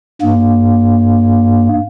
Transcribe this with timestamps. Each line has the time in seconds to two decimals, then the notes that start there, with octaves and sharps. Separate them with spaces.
0.22 G2 A#3